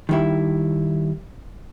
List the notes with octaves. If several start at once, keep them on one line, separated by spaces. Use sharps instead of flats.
D#3 G3 E4